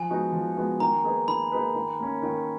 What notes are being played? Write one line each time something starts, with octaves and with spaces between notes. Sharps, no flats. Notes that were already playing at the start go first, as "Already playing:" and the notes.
Already playing: F3 G#5
G#3 B3 D#4 F#4
F3
G#3 B3 D#4 F#4
D#3 A#5
A#3 D#4 G#4 B4
D#3 B5
A#3 D#4 G#4 B4
D#3
A#3 C#4
D#3